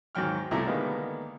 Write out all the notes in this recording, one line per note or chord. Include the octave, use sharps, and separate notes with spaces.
D#2 G#2 D#3 F#3 G5 F6
C2 B2 A3 E4 A#5
D3 D#3 G3 G#3 A#3 B3